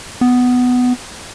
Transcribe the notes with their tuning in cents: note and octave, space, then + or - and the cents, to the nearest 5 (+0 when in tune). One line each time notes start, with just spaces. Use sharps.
B3 +10